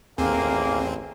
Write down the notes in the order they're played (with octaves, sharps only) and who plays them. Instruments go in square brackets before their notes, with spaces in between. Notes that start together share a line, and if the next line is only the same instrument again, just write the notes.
[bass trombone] A1 [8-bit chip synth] D#2 C4 [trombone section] A#3 [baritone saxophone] G#4